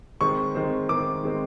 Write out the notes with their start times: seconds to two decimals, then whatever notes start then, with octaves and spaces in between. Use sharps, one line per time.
0.21 D#3 G#3 C4 C#6
0.55 D#3 G#3 C4
0.89 D#3 G#3 C4 D6
1.23 D#3 G#3 C4